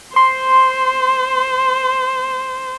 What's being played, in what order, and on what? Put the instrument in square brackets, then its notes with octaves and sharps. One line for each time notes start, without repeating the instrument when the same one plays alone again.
[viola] C5 [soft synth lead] C6